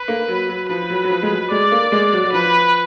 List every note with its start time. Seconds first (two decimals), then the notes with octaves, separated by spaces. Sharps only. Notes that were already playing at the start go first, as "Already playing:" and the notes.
Already playing: B4
0.08 A#3
0.28 F#3
0.49 F#3
0.69 F3 B4
0.90 F#3
1.04 F#3
1.10 F3
1.23 G#3
1.30 F#3
1.51 G#3 D5
1.71 A#3
1.92 G#3
2.12 F#3
2.24 F#3
2.33 F3 B4